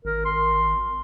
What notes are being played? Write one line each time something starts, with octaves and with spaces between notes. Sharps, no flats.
G#1 A#4
C6